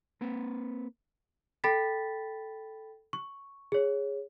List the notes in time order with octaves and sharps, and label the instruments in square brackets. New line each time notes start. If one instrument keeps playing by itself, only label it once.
[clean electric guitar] A#3 C4 B4
[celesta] A4 G5 B5 A6 B6
C#6
G#4 C#5